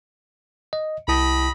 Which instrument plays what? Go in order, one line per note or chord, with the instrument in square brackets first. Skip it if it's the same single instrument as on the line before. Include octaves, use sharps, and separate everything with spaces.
[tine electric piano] D#5
[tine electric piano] C2 E4 A5 [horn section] G4 D#5 B5